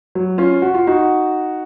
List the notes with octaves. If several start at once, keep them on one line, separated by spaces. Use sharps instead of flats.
F#3
C#4 F4
F#4
F4
D#4 F#4